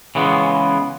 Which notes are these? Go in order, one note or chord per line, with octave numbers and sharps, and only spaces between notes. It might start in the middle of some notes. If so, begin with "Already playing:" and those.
C#3 E3 G#3 B3